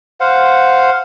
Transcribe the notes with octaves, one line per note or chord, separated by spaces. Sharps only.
C5 F5 F#5